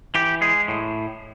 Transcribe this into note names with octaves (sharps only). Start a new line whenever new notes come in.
E3 G4
G#3 G#4
A2